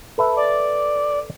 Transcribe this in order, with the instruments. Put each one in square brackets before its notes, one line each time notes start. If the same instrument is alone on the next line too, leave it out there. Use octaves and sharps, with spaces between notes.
[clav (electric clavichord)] A4 B4 E5
[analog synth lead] D5